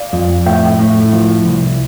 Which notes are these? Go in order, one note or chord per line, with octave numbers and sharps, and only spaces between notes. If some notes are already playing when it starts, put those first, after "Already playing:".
Already playing: D5 F5
F2
A2 E5 G5
A2
F3
C2